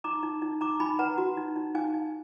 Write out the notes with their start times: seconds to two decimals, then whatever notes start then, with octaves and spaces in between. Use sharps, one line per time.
0.04 D#4 A#5 D6
0.23 D#4
0.42 D#4
0.61 D#4 A#5 D6
0.80 D#4 G#5 B5
0.99 B4 F#5 A#5
1.18 F#4
1.37 D#4
1.56 D#4
1.75 D#4 F5 G#5
1.94 D#4